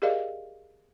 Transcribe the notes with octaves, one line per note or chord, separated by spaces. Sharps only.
G4 G#4 A#4 D5 D#5 F5